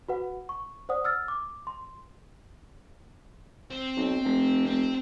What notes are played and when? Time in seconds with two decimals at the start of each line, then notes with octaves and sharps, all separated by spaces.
0.09 F#4 B4 F#5
0.49 C#6
0.89 C5 D5 F#5 D#6
1.05 E6 F6 A6
1.28 D6
1.67 C6
3.70 C4
3.97 B1
4.25 F1
4.66 C4